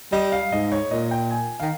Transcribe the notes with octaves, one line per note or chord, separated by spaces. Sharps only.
G3 D#5
F5
G#2 D#5
C#5
A#2 D#5
G5
G#5
D#3 F5